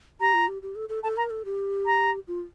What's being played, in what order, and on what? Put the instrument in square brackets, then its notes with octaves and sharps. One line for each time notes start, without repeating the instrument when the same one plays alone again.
[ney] G4 [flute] A#5
[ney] F4
G4
G4
A4
A4
[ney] A4 [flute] A5
[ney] A#4 [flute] A#5
[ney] A4
G4
[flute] A#5
[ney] F4